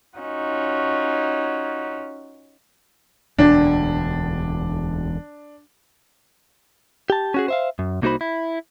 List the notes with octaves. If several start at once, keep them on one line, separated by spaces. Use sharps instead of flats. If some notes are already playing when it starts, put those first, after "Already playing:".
C#4 D#4 F4 F#4
E1 D2 D3 D4
G4 A5
C#4 F#4 G#4
C5 E5 F5
F#2
C2 A#3 D#4 F#4 C5 B5
E4